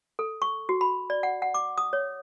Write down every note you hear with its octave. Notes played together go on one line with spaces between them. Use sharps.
A4
C#6
F#4
B5
D5
F#5
F#5
D6
D#6
C#5